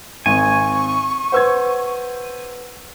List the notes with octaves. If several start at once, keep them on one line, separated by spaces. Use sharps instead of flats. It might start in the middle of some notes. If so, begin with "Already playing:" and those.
G#1 C4 G#5 C#6
B4 C5 F#5 E6 G#6